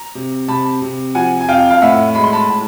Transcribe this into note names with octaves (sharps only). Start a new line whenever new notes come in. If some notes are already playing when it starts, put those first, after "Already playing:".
Already playing: A#5
C3
C3 A5 B5
C3
F3 F#5 G#5
G#5
F2 F5 G5
F5
A2 E5 F#5
G#3 B5
C6
A5 B5
A2